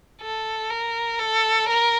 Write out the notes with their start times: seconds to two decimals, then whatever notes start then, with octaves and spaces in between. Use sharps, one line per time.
0.21 A4
0.70 A#4
1.19 A4
1.68 A#4